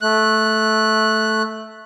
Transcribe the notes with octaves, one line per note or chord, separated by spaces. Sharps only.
A3 F#6